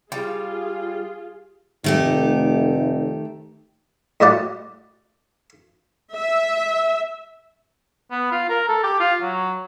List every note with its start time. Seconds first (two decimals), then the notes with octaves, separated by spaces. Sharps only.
0.12 G3 F4 G#4
1.84 F1 D#3 A3 G4
4.20 A2 F#3 G3 D5 F#5
6.14 E5
8.11 B3
8.31 F4
8.49 A#4
8.68 A4
8.83 G4
9.00 F4
9.22 F#3